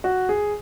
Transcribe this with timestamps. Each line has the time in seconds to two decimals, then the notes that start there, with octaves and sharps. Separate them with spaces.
0.04 F#4
0.29 G#4